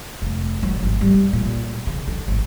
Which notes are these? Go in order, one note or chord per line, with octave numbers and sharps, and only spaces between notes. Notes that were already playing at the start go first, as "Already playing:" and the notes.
F1
F#3
G#1
G3
A#2
C#3
D3
G#1